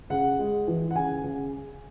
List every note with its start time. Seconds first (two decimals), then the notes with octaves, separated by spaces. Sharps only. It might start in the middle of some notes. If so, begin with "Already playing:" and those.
0.10 C#3 F#5
0.39 G#3
0.67 E3
0.91 F#5
0.95 C#3 G#5
1.24 C#3